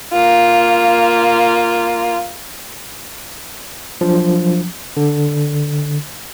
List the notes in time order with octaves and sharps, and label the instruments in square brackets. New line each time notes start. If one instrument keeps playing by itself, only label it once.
[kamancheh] A#3 F4
[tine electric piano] F3 F#3 D4
D3